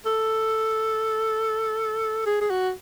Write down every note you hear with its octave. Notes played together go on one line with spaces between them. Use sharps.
A4
G#4
G#4
F#4